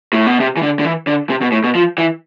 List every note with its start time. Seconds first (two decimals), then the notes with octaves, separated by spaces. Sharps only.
0.13 A2
0.27 B2
0.40 C3
0.57 E3
0.62 D3
0.79 D3
0.85 E3
1.07 D3
1.30 C3
1.42 B2
1.52 A2
1.64 B2
1.75 F3
1.98 E3